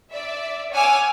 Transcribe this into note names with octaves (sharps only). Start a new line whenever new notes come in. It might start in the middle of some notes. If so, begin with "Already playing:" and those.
D5 E5
C#5 F#5 G#5 D6 E6 F6